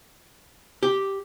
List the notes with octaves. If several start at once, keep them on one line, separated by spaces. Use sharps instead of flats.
G4